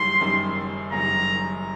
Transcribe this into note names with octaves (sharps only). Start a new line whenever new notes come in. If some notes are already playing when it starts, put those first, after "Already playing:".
Already playing: F#1 F#2 D#3 G3 C6
F#1 F#2 D#3 G3
F#1 F#2 D#3 G3 A#5